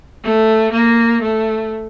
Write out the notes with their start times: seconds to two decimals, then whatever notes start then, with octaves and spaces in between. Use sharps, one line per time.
0.23 A3
0.72 A#3
1.22 A3